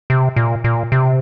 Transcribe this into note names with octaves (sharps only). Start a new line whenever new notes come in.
C3
A#2
A#2
C3